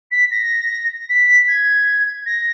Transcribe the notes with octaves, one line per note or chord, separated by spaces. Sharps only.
B6
A#6
B6
G#6
A#6